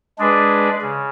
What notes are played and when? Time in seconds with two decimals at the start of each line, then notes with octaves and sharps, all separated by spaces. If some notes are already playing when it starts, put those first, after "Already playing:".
0.18 G#3 D4 G#4 B4 D5
0.81 C#3